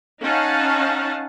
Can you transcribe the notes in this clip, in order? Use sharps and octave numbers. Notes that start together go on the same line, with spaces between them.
C#4 D#4 F5 F#5 A5